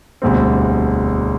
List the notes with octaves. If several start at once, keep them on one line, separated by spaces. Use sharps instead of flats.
E1 D2 D3 G3 C4